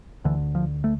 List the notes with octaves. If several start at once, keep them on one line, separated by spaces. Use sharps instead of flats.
D2 D3 E3
F3
A3